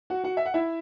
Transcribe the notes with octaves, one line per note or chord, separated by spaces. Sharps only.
F#4 F#5
F#4 F#5
E5
F#5
E4 E5